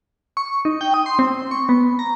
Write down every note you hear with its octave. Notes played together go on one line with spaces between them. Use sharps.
C#6
D#4
G5
D#6
C6
C4
C#6
B3
A#5